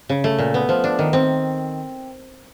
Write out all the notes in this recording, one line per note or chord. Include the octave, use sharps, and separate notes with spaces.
C#3
A3
A#2
B3
F3
D4
D#3
C4